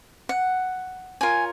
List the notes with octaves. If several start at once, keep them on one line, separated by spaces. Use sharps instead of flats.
F#5
F4 A#4 C#5 G#5